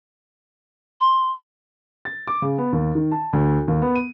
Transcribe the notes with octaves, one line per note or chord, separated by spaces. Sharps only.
C6
A6
D6
C#3
B3
D#2
D#3
A5
D2
D#2
B3
D#7